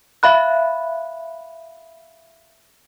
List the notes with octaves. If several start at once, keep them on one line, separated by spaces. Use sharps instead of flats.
E5 F5 B5 F#6